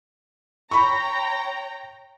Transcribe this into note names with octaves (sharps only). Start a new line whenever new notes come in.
C#5 G5 A#5 B5 C#6